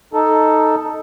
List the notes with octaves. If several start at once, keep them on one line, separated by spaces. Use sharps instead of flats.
D#4 A4